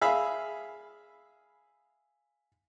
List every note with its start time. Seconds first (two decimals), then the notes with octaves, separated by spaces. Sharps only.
0.01 G#4 E5 F5 B5